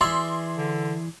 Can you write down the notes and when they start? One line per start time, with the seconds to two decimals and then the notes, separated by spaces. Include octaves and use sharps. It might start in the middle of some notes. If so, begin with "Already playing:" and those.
0.01 E3 G#4 D5 E5 C6
0.57 D3